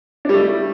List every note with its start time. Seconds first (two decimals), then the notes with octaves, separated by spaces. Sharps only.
0.25 D4
0.29 G3
0.34 A3
0.38 E4